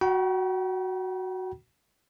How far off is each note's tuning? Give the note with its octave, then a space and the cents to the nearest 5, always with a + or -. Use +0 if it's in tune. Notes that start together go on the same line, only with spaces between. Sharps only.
F#4 +0 G5 -40 B5 -45